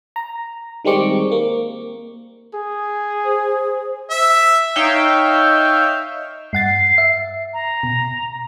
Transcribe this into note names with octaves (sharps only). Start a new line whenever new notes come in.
A#5
D#3 G3 G#3 C4 C#6 D6
A#3
G#4
C5
E5
D#4 C#5 E5 F5 G5
G2 F#5 A6 C7
E5
A#5
B2